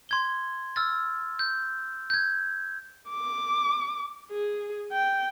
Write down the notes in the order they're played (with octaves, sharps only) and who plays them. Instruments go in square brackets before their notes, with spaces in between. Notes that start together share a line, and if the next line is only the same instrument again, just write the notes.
[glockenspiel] C6 G#6 G7
E6 F6 A6
G6
G6 G#6
[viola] D6
G#4
G5